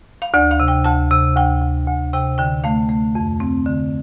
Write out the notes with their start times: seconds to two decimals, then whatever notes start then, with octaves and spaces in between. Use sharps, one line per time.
0.22 F5
0.34 D2 D5
0.51 F5
0.60 C3
0.68 G5
0.84 D2 A5
1.11 C3
1.36 D2 G5
1.62 D2
1.88 D2
2.13 C3 G5
2.38 D3 G5
2.64 A3 F5
2.89 A3
3.15 F2
3.40 C4
3.66 D3